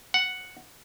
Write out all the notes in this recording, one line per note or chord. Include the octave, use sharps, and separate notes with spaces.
F#5